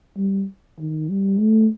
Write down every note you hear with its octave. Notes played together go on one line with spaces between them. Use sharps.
G3
D#3
G3
A3